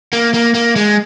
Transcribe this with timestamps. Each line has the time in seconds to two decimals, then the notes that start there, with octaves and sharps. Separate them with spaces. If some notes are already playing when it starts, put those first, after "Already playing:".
0.13 A#3
0.34 A#3
0.54 A#3
0.76 G#3